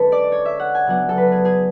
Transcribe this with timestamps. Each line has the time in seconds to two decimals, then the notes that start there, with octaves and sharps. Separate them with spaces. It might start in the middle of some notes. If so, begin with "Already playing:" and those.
Already playing: D3 G#3 C#4 A4 B4
0.12 D5
0.32 C#5
0.45 E5
0.60 F#5
0.75 G#5
0.86 C#3 F#3 B3 D4 F#5
1.09 A4
1.17 B4
1.32 G#4
1.45 G#4